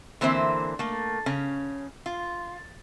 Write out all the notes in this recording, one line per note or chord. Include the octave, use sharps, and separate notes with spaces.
D3 E3 A#3 C4 C5 E5
A3 A#3
C#3 C#4
F4